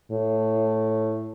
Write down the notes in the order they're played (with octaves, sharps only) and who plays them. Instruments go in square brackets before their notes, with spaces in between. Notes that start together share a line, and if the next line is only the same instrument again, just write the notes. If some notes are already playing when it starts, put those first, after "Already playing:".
[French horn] A2